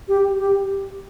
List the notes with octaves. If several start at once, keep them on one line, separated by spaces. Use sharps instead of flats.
G4
G4